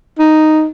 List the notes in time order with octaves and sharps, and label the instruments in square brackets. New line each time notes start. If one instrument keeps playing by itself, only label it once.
[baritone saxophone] D#4